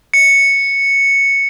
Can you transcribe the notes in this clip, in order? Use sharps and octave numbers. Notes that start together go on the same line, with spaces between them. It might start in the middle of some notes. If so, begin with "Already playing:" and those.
C#7